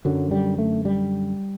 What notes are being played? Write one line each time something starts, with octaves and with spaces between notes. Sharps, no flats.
F#2 D3 F#3
G3
A3
G3